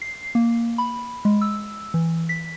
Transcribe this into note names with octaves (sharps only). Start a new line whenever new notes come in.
C7
A#3
B5
G#3
E6
E3
B6